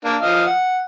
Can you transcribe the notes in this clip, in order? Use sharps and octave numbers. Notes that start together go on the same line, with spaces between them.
A#3 D4
F3 D#5 F5
F#5